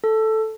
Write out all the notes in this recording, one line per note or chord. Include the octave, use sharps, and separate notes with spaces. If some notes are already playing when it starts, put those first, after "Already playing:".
A4